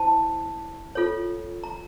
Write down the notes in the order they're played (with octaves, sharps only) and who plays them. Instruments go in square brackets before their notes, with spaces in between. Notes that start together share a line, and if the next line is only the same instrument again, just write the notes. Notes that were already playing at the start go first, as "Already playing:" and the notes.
Already playing: [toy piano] E4 C5 A5
F4 A4 C#5
A#5